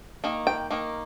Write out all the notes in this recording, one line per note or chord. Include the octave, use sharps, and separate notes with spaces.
D#3 A#3
G5
D#3 A#3